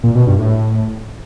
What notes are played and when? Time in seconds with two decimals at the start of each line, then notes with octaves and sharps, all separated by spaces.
0.03 A#2
0.15 B2
0.27 G2
0.39 A2